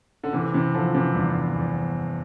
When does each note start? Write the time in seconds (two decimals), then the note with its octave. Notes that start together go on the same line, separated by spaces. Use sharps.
0.24 D3
0.33 C3 E3
0.53 C3 E3
0.74 D3 F3
0.95 C3 E3
1.15 E2 G2
1.56 E2